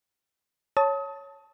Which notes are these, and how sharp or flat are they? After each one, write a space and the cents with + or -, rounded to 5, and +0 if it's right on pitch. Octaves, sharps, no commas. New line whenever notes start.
C#5 +0 A5 +0 D#6 +35